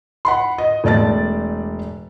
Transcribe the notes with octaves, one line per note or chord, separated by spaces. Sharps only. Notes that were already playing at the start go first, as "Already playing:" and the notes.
F#5 B5 C6
D#5
E1 A3 D5 A5 A6